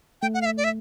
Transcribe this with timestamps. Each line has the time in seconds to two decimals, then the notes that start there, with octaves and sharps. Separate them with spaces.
0.22 A3 G5
0.34 F#5
0.41 F5
0.46 E5
0.57 D5
0.64 E5